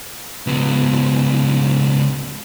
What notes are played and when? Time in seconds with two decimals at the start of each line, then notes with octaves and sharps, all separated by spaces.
0.47 C#2 B3